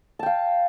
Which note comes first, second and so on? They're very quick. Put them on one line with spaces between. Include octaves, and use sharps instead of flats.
A5 G5 F5